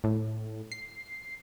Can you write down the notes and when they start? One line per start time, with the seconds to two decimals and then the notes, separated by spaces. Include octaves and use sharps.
0.04 A2
0.72 C7